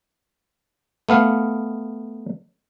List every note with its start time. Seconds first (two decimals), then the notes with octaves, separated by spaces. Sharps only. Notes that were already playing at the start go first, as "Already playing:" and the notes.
1.09 A3 B3 F5